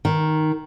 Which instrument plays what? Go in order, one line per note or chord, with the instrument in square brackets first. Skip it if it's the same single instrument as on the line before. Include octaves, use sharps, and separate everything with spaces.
[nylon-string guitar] D#3